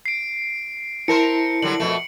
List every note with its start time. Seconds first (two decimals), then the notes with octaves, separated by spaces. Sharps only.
0.06 C7 D7
1.08 C4 E4 A#4 C5 A5 C#7
1.62 D3 F#3 G3 F#7
1.80 F2 B2 A3